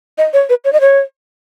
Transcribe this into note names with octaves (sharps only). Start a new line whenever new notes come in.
D#5
C#5
B4
C#5
D#5
C#5